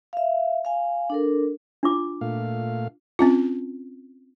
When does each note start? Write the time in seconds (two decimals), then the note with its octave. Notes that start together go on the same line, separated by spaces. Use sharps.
0.13 E5 F5
0.65 F5 G#5
1.10 D4 A4 A#4
1.83 D4 F4 D6
2.21 A#2 A3 F5
3.19 C4 C#4 F4